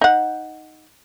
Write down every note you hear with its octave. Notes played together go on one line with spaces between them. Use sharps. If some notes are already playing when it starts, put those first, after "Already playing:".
D#4 F#5